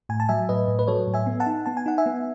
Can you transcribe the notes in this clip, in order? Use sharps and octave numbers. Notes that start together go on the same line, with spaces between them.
A2 G#5
A5
F#3 E5 G#5
A2 B4 D#5
A2
B4
F#3 A4 C#5
A2
E5 G#5
B3
F#5 A5
D#4
B3 A5
G#5
D#4 F#5
E5 G#5
B3